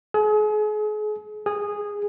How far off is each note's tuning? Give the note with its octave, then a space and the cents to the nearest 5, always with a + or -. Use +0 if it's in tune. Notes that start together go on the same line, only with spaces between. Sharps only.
G#4 +40
G#4 -10